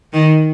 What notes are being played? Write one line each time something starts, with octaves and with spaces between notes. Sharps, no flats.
D#3